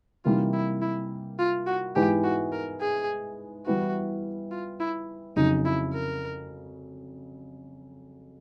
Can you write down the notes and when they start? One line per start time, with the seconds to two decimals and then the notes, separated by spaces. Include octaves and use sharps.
0.25 C3 E3 G3 A#3 D#4 F4
0.53 E4
0.82 E4
1.39 F4
1.67 F#4
1.95 G#2 E3 G#3 B3 E4 G4
2.24 F#4
2.52 A#4
2.81 G#4
3.66 E3 G3 B3 E4 F#4
4.51 F4
4.80 E4
5.36 F2 C#3 F#3 D#4
5.65 E4
5.93 A#4